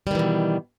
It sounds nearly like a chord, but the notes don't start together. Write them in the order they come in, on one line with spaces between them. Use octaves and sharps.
G3 D#3 E3 B2